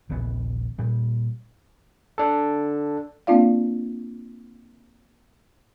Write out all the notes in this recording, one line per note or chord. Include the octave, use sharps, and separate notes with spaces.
D#1 A#1 C#3 B3
A#2 G3
D4 A4
A#3 C4 D4 F4 D5 F5